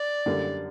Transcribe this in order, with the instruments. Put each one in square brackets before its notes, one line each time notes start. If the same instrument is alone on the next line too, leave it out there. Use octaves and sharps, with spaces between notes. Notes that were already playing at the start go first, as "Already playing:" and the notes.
Already playing: [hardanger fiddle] D5
[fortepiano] F#2 D3 G3 A#3